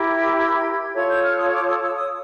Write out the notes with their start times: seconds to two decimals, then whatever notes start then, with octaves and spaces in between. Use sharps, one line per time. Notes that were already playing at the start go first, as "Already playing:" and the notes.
Already playing: E4 G4 A#4
0.36 G#6
0.94 F4 A4 C#5 G#6
1.08 G6
1.23 F6
1.37 D#6
1.52 D6
1.66 D#6
1.81 E6
1.95 D#6